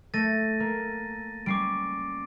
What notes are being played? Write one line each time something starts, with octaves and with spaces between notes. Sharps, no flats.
A3 A6 A#6 D#7
A#3
G3 C#4 D6 C7 D7